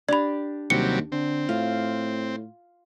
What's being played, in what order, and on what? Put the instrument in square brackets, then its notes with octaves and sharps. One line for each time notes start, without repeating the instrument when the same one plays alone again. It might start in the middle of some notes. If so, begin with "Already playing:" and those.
[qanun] D4 G4 [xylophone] D5 B5
[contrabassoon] D#2 [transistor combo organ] C3 F#3 G3 [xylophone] C#7
[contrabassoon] D3 [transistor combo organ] C4
[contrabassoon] A2 [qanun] F4